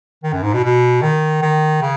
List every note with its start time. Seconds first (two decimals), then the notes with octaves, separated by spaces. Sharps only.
0.23 D#3
0.33 F#2
0.43 G#2
0.53 B2
0.64 B2
1.02 D#3
1.42 D#3
1.82 C#3